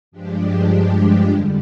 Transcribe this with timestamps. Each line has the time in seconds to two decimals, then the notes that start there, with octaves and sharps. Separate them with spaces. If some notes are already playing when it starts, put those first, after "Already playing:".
0.11 G2 F3 G#3 D4 G4
1.30 F2 D3 G3